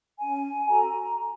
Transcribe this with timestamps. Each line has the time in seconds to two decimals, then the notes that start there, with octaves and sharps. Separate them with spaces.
0.20 C#4 G#5
0.68 F#4 A4 A#5